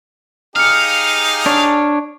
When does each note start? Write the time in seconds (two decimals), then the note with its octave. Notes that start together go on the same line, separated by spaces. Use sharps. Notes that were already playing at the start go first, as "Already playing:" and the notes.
0.56 D#4 G4 G#4 F5 F6 C#7
1.46 D4 C#5